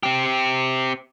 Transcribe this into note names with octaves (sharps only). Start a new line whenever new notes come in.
C4 G4